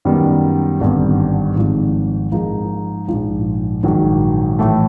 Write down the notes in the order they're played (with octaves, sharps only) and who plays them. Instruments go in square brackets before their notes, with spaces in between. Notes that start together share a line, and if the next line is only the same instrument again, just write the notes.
[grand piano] F#2 D#3 G3 B3
G#1 G2 D3 G3 B3
G#1 G#2 F3
G#2 F3 A#3 D#4 G#4
A#1 G#2 F3
A#1 G#2 D#3 F#3
A2 E3 A3